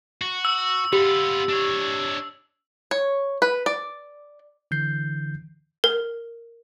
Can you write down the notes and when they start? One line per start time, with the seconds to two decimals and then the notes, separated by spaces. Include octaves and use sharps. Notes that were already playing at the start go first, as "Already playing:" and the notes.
0.22 F#4
0.45 E6
0.93 B3 F4 G4
1.49 D4 C#5
2.91 C#5
3.42 B4
3.66 D5
4.71 D3 E3 G6 C7
5.84 A#4